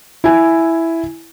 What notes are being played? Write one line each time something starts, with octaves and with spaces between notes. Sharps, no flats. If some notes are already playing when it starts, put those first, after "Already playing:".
E4 G#5